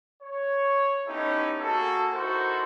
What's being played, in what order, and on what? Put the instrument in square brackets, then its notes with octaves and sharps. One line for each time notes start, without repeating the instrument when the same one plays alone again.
[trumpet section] C#5
B3 C#4 D#4 E4 G4 A4
A#3 F#4 G#4 A4
D#4 E4 F#4 A4 A#4 C5